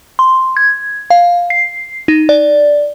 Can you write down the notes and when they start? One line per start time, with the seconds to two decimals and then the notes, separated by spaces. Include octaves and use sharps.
0.19 C6
0.57 G#6
1.10 F5
1.50 C7
2.08 D#4
2.29 D5